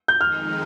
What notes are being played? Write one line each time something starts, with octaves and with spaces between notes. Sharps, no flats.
G6
F2 D#3 G#3 D#4 F6